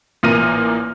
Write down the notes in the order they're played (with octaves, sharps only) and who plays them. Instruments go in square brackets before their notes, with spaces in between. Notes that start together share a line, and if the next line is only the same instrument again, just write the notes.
[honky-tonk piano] A1 A#2 A#3 F6 A#6 D#7